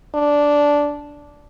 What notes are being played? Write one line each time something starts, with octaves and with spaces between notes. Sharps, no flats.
D4